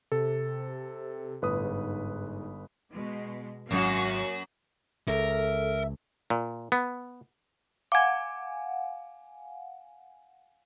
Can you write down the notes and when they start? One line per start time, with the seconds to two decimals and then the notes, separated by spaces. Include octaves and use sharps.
0.12 C3 A4
1.42 G1 A2 B4 D#6
1.64 G#2
2.94 B2 G#3
3.71 G#1 F#2 F#3 A#3 F#4
5.08 C#2 A4 A#4 E5
6.30 A#2
6.72 B3
7.92 F5 F#5 G#5 D6 G#6